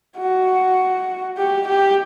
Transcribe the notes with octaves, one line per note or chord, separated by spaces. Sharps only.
F#4
G4
G4